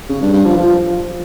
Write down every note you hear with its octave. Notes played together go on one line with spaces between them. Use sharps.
C#3
G2
G2
F3
F3